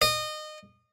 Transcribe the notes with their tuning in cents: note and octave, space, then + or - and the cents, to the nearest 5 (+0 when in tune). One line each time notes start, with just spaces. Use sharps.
D#5 -25